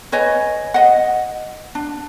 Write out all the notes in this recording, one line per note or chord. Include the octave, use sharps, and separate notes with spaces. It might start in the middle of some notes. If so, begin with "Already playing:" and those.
B4 C#5 D#5 G#5
D#5 F#5
D4